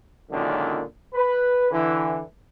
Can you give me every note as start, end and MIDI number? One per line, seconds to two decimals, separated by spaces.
0.30 0.81 37
0.30 0.81 42
0.30 0.81 46
0.30 0.81 50
0.30 0.81 51
1.14 1.71 71
1.71 2.20 50
1.71 2.20 52